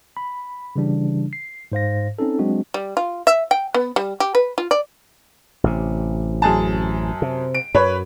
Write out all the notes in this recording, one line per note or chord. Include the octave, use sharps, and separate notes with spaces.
B5
C#3 E3 G3 D4
C7
G#2 C5 F5 A#6
C4 C#4 D#4 A4
F#3 G#3 C4 D4 F#4
G3
F4
E5
G5
B3
G3
G4
B4
F4
D5
A1 C3
F#2 G#4 A5
C3
D7
F#2 B4 C#5